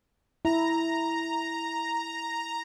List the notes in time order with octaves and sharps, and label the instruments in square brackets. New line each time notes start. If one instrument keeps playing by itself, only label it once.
[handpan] E4 [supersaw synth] A#5